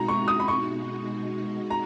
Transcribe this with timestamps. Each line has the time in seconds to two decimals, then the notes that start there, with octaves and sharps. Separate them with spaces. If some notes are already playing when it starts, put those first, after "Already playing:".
Already playing: B2 G#3 D#4 F#4 A#5
0.08 C#6
0.28 D#6
0.40 B5
0.48 C#6
1.70 A#5